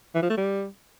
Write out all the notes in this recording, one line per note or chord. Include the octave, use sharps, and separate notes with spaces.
E3
F3
A3
G3